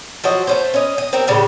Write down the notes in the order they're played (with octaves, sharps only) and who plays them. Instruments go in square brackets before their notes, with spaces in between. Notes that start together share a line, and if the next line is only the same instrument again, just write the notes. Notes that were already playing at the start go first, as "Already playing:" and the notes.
[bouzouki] F3 F#3 F#4 D#5
A3 C#4 C5
C#4 D#5
D#5
C4 D#4 G4 A#4
A2 C#3 G3 G4